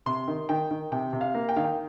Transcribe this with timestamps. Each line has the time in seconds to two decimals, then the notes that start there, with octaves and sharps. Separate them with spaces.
0.06 C3 C6
0.28 D#3
0.49 D#3 G5
0.71 D#3
0.92 C3 G5
1.13 C3
1.21 F5
1.35 A#3
1.49 G5
1.56 D#3 F5
1.64 G5